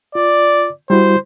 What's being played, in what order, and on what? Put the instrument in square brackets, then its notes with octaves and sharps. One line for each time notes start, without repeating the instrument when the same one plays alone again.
[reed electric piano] F4 [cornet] D5
[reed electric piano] G3 E4 F#4 [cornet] C5